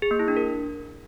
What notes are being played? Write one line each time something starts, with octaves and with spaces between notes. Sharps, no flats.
G#4
A#3
E4
D4
A#4